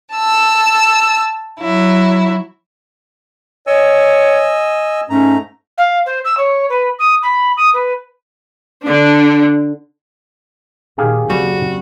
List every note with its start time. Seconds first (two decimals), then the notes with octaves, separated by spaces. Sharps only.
0.14 A5 E6
1.59 F#3 E4
3.67 C#5 D#5 G#5 E6
5.10 G#2 A3 C#4 A#5
5.77 F5
6.06 C5
6.24 E6
6.37 C#5
6.69 B4
6.99 D#6
7.22 B5
7.56 D#6
7.73 B4
8.83 D3 D4
10.98 A#2 D#3 G4 G#4 F5
11.30 F#1 D#2 G3 C4 F#4